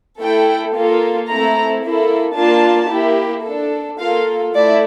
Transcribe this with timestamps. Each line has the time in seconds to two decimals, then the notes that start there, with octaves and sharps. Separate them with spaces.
0.20 A3 E4 A4 G5
0.75 A#3 F4 A4
1.28 A3 C4 E4 A4 A#5
1.84 A#3 E4 A4
2.37 A#3 D4 F4 A5
2.91 A#3 E4 G4
3.46 D4 A4
3.99 A#3 F4 A4 F5
4.54 A3 E4 D5